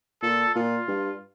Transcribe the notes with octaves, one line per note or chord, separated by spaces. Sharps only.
A#2 A4
A#2 F4
G2